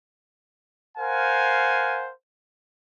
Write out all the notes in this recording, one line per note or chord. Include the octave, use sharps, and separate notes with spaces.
A#4 C5 F5 F#5 G#5